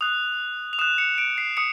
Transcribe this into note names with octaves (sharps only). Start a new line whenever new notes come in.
D#6 F#6 F7
F7
D#6 F#6 E7
C#7
D7
C7
D#6 C#7